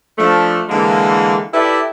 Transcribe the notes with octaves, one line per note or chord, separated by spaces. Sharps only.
F3 A3 D4
D3 E3 G#3 A#3
E4 G4 A4 B4 D5 E5